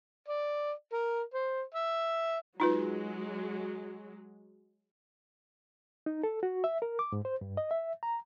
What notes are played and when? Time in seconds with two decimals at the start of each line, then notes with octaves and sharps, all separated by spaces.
0.28 D5
0.93 A#4
1.34 C5
1.74 E5
2.60 F#3 G#3 D#4 F4 B4
6.06 D#4
6.23 A4
6.43 F#4
6.64 E5
6.82 A#4
6.99 D6
7.12 G#2
7.25 C5
7.41 G2
7.57 D#5
7.71 E5
8.03 A#5